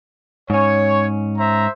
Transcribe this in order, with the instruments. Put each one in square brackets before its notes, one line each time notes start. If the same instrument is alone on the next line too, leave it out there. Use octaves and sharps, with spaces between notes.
[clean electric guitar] G#2 C#4 [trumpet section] C#5
[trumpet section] C5 E5 A#5